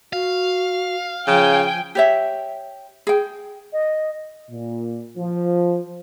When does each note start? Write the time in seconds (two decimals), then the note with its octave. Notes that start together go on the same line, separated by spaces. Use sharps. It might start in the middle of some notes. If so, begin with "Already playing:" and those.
0.13 F#4 F5
1.27 C#3 F3 G5 G#5
1.95 G4 C#5 E5
3.07 G#4 G5
3.73 D#5
4.50 A#2
5.17 F3